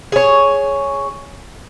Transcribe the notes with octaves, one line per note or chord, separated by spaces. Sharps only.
G#4 C#5